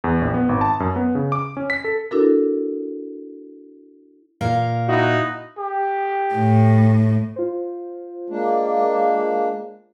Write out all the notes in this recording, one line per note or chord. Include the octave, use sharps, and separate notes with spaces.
E2
A#1
B3
G#1
A5
F#2
B3
C#3
D6
C#4
B6
A4
D4 E4 F#4 A4 A#4
A#2 A#4 F5
D#4 E4 F#4
G4
A2
F4 C5
G#3 A#3 D4